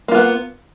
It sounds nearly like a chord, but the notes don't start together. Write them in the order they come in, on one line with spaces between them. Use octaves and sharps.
A#3 F4 B3